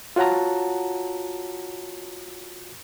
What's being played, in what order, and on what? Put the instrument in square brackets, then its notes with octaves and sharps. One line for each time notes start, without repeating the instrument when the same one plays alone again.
[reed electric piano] F4 F#4 C#5 F#5 A5 A#5